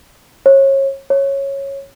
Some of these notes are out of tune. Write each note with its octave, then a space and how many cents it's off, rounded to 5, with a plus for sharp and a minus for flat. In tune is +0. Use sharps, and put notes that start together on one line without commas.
C#5 -30
C#5 -10